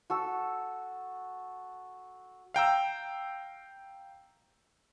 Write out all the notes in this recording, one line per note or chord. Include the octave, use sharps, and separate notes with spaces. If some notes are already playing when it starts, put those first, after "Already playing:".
F#4 A4 E6
F5 G5 A#5 E6